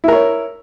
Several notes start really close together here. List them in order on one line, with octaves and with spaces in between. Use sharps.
E4 A#4 C#5